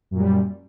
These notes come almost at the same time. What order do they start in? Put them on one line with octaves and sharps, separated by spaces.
F#2 A#2 G3